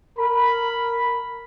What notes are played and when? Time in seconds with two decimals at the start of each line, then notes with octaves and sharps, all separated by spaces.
0.18 A#4 B5